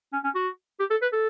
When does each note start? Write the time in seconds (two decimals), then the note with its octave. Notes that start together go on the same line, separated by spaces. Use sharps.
0.13 C#4
0.24 C#4
0.35 F#4
0.80 G4
0.90 A4
1.02 B4
1.13 A4